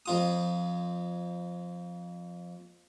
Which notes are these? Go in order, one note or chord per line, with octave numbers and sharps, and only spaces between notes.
F2 F4 D#6